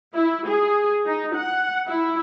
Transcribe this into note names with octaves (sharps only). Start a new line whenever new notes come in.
E4
G#4
D#4
F#5
E4